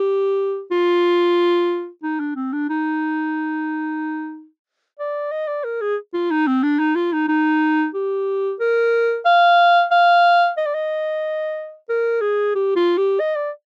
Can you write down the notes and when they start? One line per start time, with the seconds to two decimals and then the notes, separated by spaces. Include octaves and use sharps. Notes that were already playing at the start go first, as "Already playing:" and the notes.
Already playing: G4
0.71 F4
2.03 D#4
2.20 D4
2.35 C4
2.53 D4
2.69 D#4
4.99 D5
5.32 D#5
5.47 D5
5.64 A#4
5.81 G#4
6.14 F4
6.31 D#4
6.47 C4
6.63 D4
6.79 D#4
6.95 F4
7.13 D#4
7.28 D#4
7.94 G4
8.60 A#4
9.25 F5
9.91 F5
10.57 D#5
10.66 D5
10.74 D#5
11.89 A#4
12.21 G#4
12.55 G4
12.76 F4
12.98 G4
13.20 D#5
13.36 D5